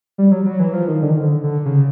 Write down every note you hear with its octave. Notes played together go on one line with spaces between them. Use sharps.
G3
F#3
F#3
E3
F3
D#3
D3
D#3
D3
D3
C#3